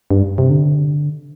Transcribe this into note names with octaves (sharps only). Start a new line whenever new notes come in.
G2
C3
D3